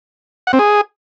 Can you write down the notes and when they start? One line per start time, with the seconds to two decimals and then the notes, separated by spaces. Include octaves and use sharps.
0.47 F#5
0.53 C4
0.59 G#4